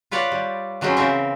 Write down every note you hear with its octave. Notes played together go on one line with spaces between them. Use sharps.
F4 B4 C#5 D5 F#5
G3
E3 F#3 G#3 C4 C#4
C#3 C4 A#4 C5 E5